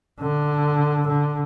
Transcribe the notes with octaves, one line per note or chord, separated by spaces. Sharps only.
D3
D3